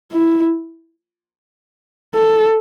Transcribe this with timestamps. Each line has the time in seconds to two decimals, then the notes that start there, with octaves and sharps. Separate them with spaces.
0.12 E4
2.15 A4